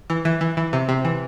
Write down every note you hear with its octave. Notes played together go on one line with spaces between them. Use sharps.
E3
E3
E3
E3
C3
C3
E3